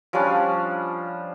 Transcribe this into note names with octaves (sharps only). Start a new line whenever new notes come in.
F3 G3 C#4 D4